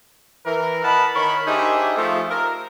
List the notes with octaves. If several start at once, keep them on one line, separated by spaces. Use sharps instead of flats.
E3 A#4
D#5 F#5 A5 B5
D#3 A#4 C#5 B5
D4 D#4 G4 G#4 C5 E5
F3 A3 E5
A#4